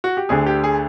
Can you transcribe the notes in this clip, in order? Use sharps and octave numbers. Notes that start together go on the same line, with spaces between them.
F#4
G4
D2 D3 G#4
G4
G#4